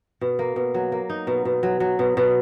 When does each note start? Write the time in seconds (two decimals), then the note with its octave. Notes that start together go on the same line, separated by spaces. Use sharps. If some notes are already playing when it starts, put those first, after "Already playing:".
0.21 B2
0.39 A#3
0.56 B2
0.74 F#3
0.92 A#3
1.10 D#4
1.27 B2
1.45 B2
1.63 F#3
1.80 F#3
1.99 B2
2.17 B2